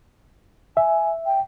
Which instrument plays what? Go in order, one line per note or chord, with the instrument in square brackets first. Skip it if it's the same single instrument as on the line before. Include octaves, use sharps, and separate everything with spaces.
[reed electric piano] E5 [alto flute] G#5
[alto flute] G5